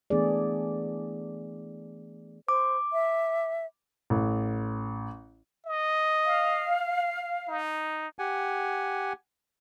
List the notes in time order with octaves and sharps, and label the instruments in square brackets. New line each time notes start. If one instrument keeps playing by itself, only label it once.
[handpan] E3 A3 B3 D4 G#4 D5
[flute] C5 [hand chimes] D6
[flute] E5
[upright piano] A1
[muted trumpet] D#5
[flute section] F5
[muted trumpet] D#4
[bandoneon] G4 F#5 G#5